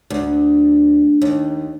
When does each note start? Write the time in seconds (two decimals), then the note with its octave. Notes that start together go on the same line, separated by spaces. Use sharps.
0.10 D2
1.22 D#2